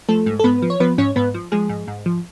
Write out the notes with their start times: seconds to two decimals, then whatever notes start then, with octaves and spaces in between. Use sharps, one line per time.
0.09 F3 A3 A4
0.26 G#2
0.39 A4
0.44 G#2 B3 B4
0.62 F3
0.70 C#5
0.80 F3 B3 B4
0.98 G#2 C#4 C#5
1.16 G#2 B3 B4
1.34 F3
1.52 F3 G#3 G#4
1.69 G#2
1.88 G#2
2.06 F3